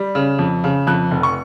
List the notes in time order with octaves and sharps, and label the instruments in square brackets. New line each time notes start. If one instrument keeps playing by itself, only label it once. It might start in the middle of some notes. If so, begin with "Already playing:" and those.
Already playing: [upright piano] G3
C#3
F2
C#3
F2 F#6
F1
C#6